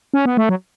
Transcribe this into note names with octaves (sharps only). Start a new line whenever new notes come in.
C#4
B3
A3
F#3